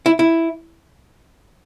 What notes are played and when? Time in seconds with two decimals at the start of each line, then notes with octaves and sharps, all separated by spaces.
0.06 E4
0.19 E4